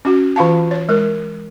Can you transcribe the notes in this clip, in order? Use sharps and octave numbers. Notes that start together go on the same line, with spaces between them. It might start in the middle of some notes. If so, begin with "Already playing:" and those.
C#4 F#4
E3 F4 F5 A5
C#5
G#3 A#4